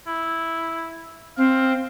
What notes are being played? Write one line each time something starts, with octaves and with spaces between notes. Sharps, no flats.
E4
C4 F5